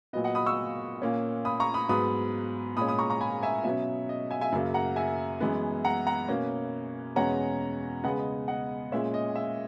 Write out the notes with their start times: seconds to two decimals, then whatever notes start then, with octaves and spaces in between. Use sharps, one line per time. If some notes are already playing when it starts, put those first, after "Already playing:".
0.13 A#2 F#3 B3 D#5
0.24 D#5 F#5
0.35 B5 D#6
0.46 C#6 E6
1.02 A#2 A#3 C#4
1.45 B5 D#6
1.60 A#5 C#6
1.74 B5 D#6
1.89 G#2 F#3 B3 B5 D#6
2.77 A#2 G#3 C#4 B5 D#6
2.88 B5 D#6
2.99 A#5 C#6
3.10 A#5 C#6
3.21 G#5 B5
3.43 E5 G#5
3.64 B2 F#3 C#4 E5
4.09 D#5
4.31 E5 G#5
4.41 E5 G#5
4.52 F#2 C#3 F#3 A#3
4.74 F#5 A#5
4.96 E5 G#5
5.41 F#2 E3 G#3 B3
5.85 F#5 A#5
6.07 F#5 A#5
6.28 B2 A#3 C#4
7.16 E2 B2 G#3 C#4 F#5 A#5
8.04 C#3 G#3 B3 D#5 F#5
8.19 D#5
8.48 D#5 F#5
8.92 A#2 G#3 C#4 E5
9.14 D#5
9.36 E5